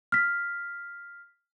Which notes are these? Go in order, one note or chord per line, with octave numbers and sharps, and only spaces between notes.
F6 B6